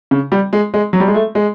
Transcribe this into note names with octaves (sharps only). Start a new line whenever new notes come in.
C#3
G3
G#3
G#3
F#3
G3
G#3
A3
G#3